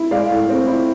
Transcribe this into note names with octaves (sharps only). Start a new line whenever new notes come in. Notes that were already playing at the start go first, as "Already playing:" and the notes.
Already playing: E4
G#3 D5 F5
A2
C4
E4